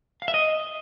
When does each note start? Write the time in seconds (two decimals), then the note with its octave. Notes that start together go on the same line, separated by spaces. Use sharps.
0.22 F5
0.28 E5
0.34 D#5